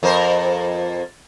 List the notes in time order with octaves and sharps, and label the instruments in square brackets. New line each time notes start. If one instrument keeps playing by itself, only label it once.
[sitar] F2 A#4 C5